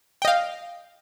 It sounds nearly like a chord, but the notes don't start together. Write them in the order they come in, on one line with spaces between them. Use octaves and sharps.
G5 D#5 F5